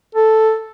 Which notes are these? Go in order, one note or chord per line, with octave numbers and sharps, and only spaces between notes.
A4